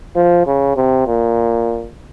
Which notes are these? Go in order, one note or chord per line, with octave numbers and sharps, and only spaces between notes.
F3
C#3
C3
A#2